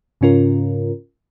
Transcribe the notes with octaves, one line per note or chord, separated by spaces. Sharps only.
G#2 C#3 C#4 F4 A#4